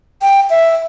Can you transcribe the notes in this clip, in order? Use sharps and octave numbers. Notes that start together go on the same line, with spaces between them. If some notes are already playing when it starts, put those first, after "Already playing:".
G5
E5